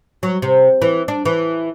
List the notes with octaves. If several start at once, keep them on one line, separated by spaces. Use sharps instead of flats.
F#3
C3
E3
D4
E3